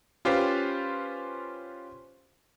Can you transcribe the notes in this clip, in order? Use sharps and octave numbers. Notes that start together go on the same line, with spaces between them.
C#4 F4 G4 B4 C5